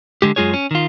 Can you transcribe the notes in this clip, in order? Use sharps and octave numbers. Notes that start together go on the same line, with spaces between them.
D3 G#3 G4
F#2 G#3 F4 G#4 C#5
C#4
D#3 F4